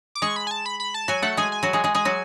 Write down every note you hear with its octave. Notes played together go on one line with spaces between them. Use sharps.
D6
G#3 G#4 C#6
B5
G#5
A5
B5
B5
A5
F#3 F#4 G#5
A3 A4 F#5
G#3 G#4 G#5
G#5
F#3 F#4
G#3 G#4
G#3 G#4
G#3 G#4 G#5
F#3 F#4